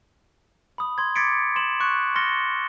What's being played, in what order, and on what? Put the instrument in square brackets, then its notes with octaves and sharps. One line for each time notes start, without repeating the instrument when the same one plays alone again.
[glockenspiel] B5 D#6
C6 G#6
D6 G#6 A6 B6 C#7 D7
C6 E7 F#7
C#6 F#6 C#7
C6 F6 A6 A#6 C#7 G7